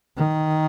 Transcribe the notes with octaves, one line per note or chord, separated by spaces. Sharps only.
D#3